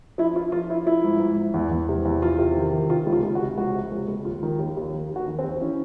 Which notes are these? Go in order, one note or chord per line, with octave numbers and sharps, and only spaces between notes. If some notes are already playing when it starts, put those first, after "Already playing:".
F3 E4
F3 F4
F3 F4
F3 E4
F3 E4
G#2
G#2
G#2
E2
E2
C3
E2
E2 F4
C3
D#3
D#3
C3 F4
C#2
F4
C#2
F#4
C3
C#2 F#4
C3
C#2
C#2
D#2 F4
D#3
D#2
D#2
D#3
D#2
F#4
D#3
C4
D#2
E3 C#4